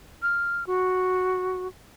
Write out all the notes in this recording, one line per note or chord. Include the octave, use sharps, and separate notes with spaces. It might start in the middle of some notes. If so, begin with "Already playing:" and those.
F6
F#4